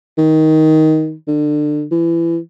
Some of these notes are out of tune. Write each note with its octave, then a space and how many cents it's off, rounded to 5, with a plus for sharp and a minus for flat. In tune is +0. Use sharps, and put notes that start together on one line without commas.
D#3 +15
D3 +25
E3 +25